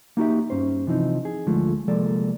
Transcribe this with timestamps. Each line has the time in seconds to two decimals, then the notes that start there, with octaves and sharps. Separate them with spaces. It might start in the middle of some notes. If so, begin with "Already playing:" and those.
0.17 A#3 D#4 F#4 G4 E5
0.50 G2 C#4 C5
0.87 C3 E3 F3 C4 D#4
1.25 G#4
1.46 D2 D3 F3 G#3 A3
1.88 C2 F3 G#3 A#3 A4 D5